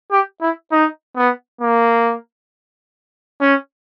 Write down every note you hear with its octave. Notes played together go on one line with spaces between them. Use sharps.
G4
E4
D#4
B3
A#3
C#4